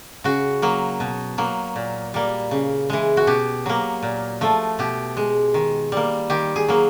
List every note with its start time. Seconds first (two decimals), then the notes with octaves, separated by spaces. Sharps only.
0.24 C#3 F#4
0.62 F#3 A#3
1.00 B2
1.38 F#3 A#3
1.76 A#2
2.14 G3 A#3
2.51 C#3
2.90 E3 G#3
3.17 F#4
3.27 B2 G4
3.66 F#3 A#3
4.03 A#2
4.41 F3 A3
4.79 B2 G4
5.17 G#3
5.54 D#3
5.92 G3 A#3
6.30 D#3 G4
6.56 G#4
6.68 F#3 A#3